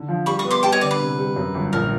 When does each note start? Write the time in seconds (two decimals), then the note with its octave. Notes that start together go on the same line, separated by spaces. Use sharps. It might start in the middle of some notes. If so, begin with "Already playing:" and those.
Already playing: D3
0.09 F3
0.26 G3 B5 C#6
0.39 C#6 D#6
0.44 B3
0.50 C6 D6
0.63 G3 G5 A5
0.72 C#5 D#5
0.81 D3 D5
0.91 B4
1.00 C3
1.18 G3
1.36 F#2
1.54 G1
1.73 A#1 A#4